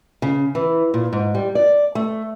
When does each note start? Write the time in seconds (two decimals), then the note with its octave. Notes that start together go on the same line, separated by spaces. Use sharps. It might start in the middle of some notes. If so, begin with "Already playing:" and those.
0.22 C#3
0.55 E3
0.94 A#2
1.13 G#2
1.35 G3
1.55 D5
1.95 A3